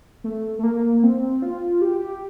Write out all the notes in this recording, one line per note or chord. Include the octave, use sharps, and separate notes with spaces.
A3
A3
A#3
C4
F4
G4